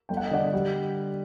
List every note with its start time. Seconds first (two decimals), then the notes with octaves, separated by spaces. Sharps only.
0.09 G1 G5
0.17 F#5
0.26 D#5
0.31 D3 D5 F#5
0.54 G3